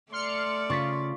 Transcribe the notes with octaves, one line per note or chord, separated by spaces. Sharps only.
A3 D5 C6 F6 C#7
C#3 F4 C#6 A6 B6